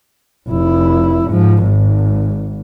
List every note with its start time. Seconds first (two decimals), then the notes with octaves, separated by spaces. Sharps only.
0.49 F1 E4
1.27 G#2 F3
1.63 G#1 G#2